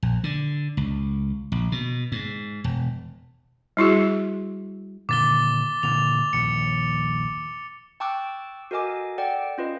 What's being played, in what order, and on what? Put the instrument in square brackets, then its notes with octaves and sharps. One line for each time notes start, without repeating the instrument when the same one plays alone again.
[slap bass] A#1
D3
C#2
A#1
B2
G#2
E1
[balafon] G3 E4 F#4 G#4
[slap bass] A#2 D3 D#3 [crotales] D6 A6 G7
[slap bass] A#2 D3 E3 [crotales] F7
[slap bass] A#1 D#2 [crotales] C#7
[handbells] G5 A5 C#6 D6 E6 F#6
F#4 A4 A#4 D#5 G#5 D6
A4 D5 F#5 G5
C#4 F4 B4 D#5